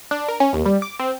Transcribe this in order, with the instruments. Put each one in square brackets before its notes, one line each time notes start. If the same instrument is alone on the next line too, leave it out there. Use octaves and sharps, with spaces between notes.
[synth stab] D4
A#4
C#4
D#2
G3
D6
C4